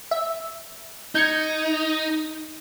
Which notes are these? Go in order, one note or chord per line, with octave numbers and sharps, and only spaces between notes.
E5
D#4 G6 G#6 C#7